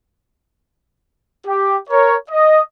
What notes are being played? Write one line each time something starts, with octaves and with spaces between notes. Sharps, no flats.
G4
A#4 C#5
D#5